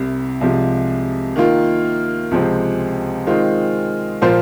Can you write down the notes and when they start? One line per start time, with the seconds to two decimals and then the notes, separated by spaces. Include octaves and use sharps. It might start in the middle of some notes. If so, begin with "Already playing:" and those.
Already playing: C2 C3 G3
0.41 C2 C3 F3 G#3
1.36 D#3 A#3 F4
2.31 C#2 C3 F3 G#3 C4
3.27 D#3 G#3 C4 F4
4.22 A#2 F3 A#3 F4 C5